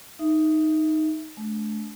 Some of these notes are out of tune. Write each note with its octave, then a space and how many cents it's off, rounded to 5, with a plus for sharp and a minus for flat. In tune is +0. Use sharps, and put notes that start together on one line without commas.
D#4 +0 E5 +5
A3 -40 D4 -15